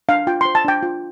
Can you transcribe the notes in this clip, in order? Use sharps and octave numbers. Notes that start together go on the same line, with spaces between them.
D4 F5
F4 G5
C5 C6
A5
D4 G5
F4